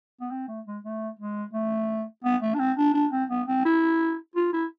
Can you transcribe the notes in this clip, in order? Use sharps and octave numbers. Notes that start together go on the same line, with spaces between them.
B3
C4
A3
G#3
A3
G#3
A3
B3
A3
D4
C4
D4
D4
C4
B3
C4
E4
F4
E4